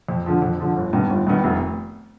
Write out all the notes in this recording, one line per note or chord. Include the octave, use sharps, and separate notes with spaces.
F2
D3 F3
F2
D3 F3
G1
G2 D#3 B3
G1
G2 D#3 B3
F1